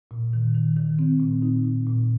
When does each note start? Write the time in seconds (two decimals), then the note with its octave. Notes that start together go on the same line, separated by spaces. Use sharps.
0.11 A#2
0.33 D#3
0.55 D#3
0.76 D#3
0.99 C4
1.20 A#2
1.42 D#4
1.64 A#2
1.87 A#2